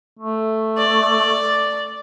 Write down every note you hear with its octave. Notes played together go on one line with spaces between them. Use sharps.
A3
D5